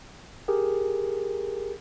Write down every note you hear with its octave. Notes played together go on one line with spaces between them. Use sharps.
G4 G#4 A#4